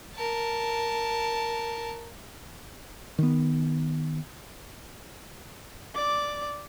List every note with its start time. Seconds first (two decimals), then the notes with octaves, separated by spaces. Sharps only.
0.15 A#4 A5
3.18 D#3 B3
5.95 D5 D6